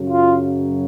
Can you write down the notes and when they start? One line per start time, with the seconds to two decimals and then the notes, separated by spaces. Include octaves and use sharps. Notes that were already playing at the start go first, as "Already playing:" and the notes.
Already playing: F#2 C#3 F#3
0.08 F4